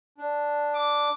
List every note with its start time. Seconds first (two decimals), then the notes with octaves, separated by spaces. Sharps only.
0.18 D4
0.75 D6